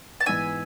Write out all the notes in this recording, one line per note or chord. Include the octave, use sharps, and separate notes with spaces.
A5
G#2 E3 B3 D#4 E5 G#5